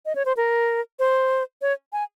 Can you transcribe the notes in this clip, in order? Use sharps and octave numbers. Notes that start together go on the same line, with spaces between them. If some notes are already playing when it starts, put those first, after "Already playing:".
D#5
C#5
C5
A#4
C5
C#5
G#5